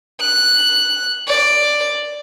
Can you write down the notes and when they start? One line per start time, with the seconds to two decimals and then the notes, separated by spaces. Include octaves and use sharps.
0.21 F#6
1.27 D5